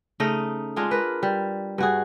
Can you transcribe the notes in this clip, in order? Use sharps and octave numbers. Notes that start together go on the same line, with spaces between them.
C#3 A3 D#4 D#5
G#3 D4 F4 G#4
A#4 B4
G3
G2 F#4 G#4